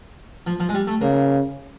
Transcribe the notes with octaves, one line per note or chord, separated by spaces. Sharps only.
F3
F3
G#3
G3
A3
C#3 A#3